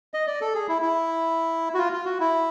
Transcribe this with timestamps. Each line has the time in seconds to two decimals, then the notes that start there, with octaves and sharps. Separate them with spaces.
0.14 D#5
0.27 D5
0.41 A4
0.54 G#4
0.68 E4
0.82 E4
1.74 F#4
1.79 F4
1.93 F4
2.06 F#4
2.20 E4